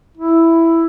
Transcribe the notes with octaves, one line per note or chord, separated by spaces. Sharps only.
E4